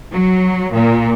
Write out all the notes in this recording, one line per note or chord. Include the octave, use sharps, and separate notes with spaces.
F#3
A#2